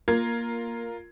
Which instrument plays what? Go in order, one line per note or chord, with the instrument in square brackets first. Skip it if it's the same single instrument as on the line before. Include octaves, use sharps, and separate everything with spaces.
[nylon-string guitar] A#3 [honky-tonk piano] F4 A#4 G#6